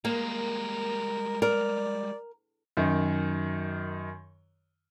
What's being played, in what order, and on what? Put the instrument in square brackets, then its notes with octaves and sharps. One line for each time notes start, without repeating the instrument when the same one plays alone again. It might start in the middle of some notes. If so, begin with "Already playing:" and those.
[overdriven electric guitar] G3 G#3 [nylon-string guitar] A#3 [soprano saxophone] A#4
[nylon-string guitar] A#4 [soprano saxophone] D5
[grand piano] F#2 D#3